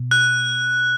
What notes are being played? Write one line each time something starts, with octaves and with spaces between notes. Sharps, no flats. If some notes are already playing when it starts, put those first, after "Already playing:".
Already playing: B2
F#6